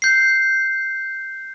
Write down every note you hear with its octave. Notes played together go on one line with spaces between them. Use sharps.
G6 C7